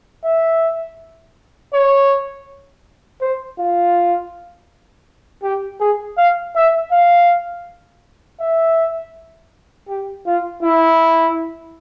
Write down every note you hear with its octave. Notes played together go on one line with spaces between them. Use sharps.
E5
C#5
C5
F4
G4
G#4
F5
E5
F5
E5
G4
F4
E4